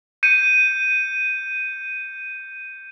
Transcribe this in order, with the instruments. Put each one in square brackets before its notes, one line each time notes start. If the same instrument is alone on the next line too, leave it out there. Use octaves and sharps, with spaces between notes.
[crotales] G6 C#7 D#7